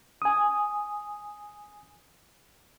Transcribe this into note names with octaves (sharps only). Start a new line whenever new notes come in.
G#5 D#6